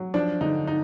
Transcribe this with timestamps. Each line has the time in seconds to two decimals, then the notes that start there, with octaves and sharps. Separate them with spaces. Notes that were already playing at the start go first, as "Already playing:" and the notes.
Already playing: F#3
0.14 F3 D4
0.41 D3 D#4
0.67 D#4